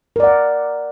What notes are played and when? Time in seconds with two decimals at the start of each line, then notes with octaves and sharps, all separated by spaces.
0.16 A#4
0.20 D5
0.24 F#5